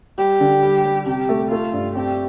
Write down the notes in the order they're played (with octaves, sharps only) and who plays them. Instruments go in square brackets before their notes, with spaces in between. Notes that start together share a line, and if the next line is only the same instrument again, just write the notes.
[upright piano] G3 [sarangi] G4
[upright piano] D3
G3
G3
[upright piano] C3 [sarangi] G4
[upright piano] A3
[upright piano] A3 [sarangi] F4
[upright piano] G2
[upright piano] C4 [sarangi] G4